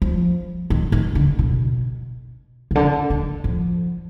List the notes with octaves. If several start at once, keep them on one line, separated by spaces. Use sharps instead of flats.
F3
D#3
D#3
D3
B2
B2
D3
D#3
F3